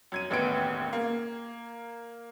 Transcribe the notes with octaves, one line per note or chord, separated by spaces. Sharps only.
F#2 G#6 D#7
E1 A1 D#2 B3 D7
A#3